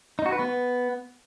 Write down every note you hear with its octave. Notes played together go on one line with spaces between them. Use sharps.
D#4
F#4
B4
B3